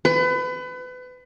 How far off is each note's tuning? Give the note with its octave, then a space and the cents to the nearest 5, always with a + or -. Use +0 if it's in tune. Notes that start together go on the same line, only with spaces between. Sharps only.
B4 +30